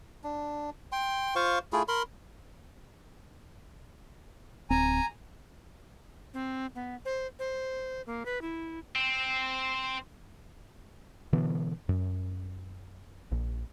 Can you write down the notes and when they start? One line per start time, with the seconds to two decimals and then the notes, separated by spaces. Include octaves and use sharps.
0.24 D4
0.92 G5 C6
1.35 F4 C5 F5 C#6
1.73 A3 E4 F4 G#4
1.88 A#4 B5 C6
4.70 D1 C4 G#5 A#5
6.34 C4
6.75 B3
7.05 C5
7.39 C5
8.06 A#3
8.26 B4
8.42 E4
8.96 C4
11.33 B2 D3 E3 B3
11.89 F#2
13.32 A#1